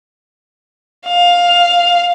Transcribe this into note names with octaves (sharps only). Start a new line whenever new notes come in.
F5